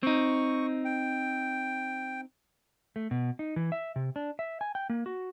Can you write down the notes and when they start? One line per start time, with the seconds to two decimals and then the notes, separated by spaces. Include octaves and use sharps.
0.03 C4 D#4 C#6
0.85 G5
2.96 A3
3.11 B2
3.39 D#4
3.56 E3
3.72 E5
3.96 C3
4.16 D4
4.39 E5
4.61 G#5
4.75 G5
4.90 A#3
5.06 F#4